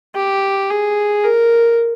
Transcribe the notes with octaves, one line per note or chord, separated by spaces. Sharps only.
G4
G#4
A#4